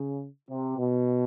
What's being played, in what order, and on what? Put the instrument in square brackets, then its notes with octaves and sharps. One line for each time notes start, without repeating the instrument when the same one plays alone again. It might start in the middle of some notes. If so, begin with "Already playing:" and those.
Already playing: [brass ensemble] C#3
C3
B2